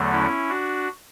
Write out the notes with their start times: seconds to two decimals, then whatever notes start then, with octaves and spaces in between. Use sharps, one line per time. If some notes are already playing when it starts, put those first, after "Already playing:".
Already playing: E2 D3 F#3 A3
0.11 C#4 E4
0.48 D4 F#4